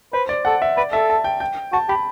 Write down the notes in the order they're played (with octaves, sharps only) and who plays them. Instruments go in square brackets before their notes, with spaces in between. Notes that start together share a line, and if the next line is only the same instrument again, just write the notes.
[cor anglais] B4 [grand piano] C5
[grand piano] D5
[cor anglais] A4 [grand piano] F#5
[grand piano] E5
[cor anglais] B4 [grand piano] D5
[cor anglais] A4 [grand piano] E5
[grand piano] A5
G5
G5
[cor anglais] F#4 [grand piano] A5
[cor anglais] G4 [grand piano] B5